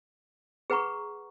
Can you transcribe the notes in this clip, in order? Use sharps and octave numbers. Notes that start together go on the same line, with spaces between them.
G#4 B4 F#5 A#5 C#6